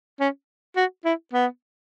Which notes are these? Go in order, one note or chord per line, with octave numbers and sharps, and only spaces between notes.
C#4
F#4
E4
B3